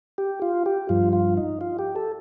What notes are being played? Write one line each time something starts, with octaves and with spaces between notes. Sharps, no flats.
G4
F4
G4
G2 F3 F4
F4
D#4
F4
G4
A4